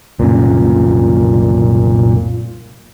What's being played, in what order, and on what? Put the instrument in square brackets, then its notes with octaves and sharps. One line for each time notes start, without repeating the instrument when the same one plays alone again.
[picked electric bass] C2 F#2 C#3 [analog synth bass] A#2